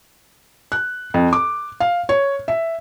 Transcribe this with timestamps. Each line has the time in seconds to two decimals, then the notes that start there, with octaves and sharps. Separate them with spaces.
0.72 F#6
1.14 F2
1.33 D6
1.80 F5
2.09 C#5
2.48 E5